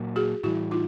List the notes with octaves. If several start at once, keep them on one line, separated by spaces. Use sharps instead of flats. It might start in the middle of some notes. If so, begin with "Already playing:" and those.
Already playing: A#2 F#3 A#3
F#4 G#4
A2 E3 G3 E4 F#4
D#4 F4